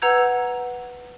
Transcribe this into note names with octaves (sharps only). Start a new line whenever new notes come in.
B4 F#5 A#5 E6 G6 G#6